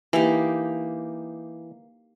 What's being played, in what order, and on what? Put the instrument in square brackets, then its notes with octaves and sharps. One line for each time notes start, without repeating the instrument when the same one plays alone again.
[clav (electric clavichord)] E3 [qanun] A#3 D#4 G4